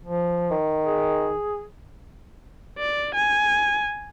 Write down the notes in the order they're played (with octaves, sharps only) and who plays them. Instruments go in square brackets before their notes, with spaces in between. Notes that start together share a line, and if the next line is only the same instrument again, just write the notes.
[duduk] F3
[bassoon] D#3
[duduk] G#4
[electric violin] D5
G#5